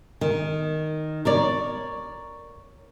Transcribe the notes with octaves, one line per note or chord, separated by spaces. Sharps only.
D#3
A#4 C#5 D5